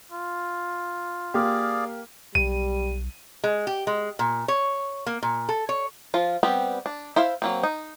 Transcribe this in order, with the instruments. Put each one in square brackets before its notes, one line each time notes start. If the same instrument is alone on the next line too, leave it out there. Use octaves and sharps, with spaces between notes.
[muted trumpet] F4
[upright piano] A#3 G4 [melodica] G#4 D5 F5
[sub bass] B1 [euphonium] G3 [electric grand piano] D#7
[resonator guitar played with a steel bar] G#3
G4
G#3
A#2
C#5
A#3
A#2
A4
C#5
[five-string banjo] F3 F4
G3 B3 C4 G4
D4
E4 C5 E5 F5
F#3 A#3 C4
D#4